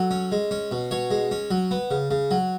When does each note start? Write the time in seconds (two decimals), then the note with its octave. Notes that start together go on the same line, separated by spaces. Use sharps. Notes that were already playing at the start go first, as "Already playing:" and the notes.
Already playing: F#3 A4
0.11 C#4
0.32 G#3
0.51 C#4
0.72 B2
0.91 B2 C#5
1.11 G#3
1.31 C#4
1.51 F#3
1.71 B3
1.91 C#3
2.11 C#3
2.31 F#3